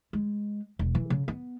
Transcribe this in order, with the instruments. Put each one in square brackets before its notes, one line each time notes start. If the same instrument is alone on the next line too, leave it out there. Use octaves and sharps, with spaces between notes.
[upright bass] G#3
E1
E3
C#3
B3